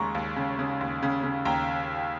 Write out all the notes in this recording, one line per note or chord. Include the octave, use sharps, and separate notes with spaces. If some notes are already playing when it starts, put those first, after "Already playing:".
Already playing: D#2 C#3 G#3 A#5 C6 C#6
D#2
C#3
C#3
D#2
C#3
C#3
D#2 G5 A#5